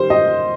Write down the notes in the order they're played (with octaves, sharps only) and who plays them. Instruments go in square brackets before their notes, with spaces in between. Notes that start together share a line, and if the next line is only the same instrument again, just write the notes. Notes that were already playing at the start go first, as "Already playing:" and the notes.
Already playing: [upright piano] D#3 G3 C5
D#5